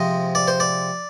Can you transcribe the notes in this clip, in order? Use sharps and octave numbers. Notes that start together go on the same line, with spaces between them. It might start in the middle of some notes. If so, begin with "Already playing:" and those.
Already playing: C3 F3 G#3 D#5
D5
C5
D5